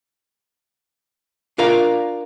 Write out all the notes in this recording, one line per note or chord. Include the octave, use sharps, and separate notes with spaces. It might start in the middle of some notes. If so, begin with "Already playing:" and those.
D4 F4 A#4 D5 F5